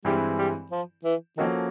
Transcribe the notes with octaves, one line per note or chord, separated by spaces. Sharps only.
G2 E3 G3 G#3 C4 E4
G3
F3
E3
D#3 F3 A#3 C#4 F#4 A4